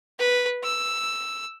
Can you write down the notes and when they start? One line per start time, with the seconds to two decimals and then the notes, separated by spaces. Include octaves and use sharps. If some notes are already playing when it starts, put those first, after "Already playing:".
0.19 B4
0.63 E6